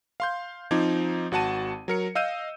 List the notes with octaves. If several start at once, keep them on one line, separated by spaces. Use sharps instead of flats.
F5 C6 G6
F3 C4 D#4 D6 G#6
G#1 F#4 F#5 A5 D#7
F#3 A#4 C#7
D#5 F5 E6 G6 D#7